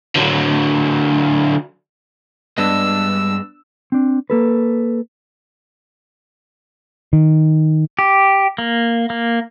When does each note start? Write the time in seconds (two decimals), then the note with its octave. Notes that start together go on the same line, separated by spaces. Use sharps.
0.16 D3 F#3
2.58 G2 G3 G#3 B3 D4 D#5 E6
3.92 C4 D4
4.30 A#3 A4 B4
7.13 D#3
7.99 G4
8.58 A#3
9.10 A#3